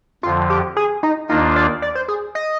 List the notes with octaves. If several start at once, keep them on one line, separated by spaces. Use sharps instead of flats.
F2 D3 F3 F4
G4
G#4
D#4
D#2 D#3 A#3 D4 D#4 F4
D5
D5
C5
G#4
D#5